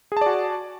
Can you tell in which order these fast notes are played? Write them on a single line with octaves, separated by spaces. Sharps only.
G#4 A5 D5 F#4